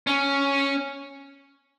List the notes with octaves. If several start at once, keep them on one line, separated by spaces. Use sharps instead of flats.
C#4